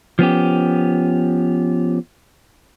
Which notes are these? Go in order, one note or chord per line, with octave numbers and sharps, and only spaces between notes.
F3 B3 C#4 G4